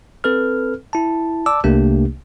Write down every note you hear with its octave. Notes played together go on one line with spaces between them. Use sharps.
C4 A4 B4 F6
E4 A5
D5 A5 D6 E6
C2 C3 A3 A#3 D4 G4